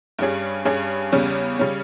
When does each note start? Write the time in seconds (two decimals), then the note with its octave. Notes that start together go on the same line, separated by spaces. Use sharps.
0.19 G2 G3 C#4 G#4
0.65 G2 G3 C#4 G#4
1.12 E2 C#3 G3 C#4
1.59 C#3 G3 C#4